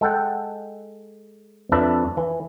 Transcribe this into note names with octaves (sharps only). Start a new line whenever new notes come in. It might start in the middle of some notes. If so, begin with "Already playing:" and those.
G#3 A4 F#5 G5
F2 D4 B4 E5 A5
E3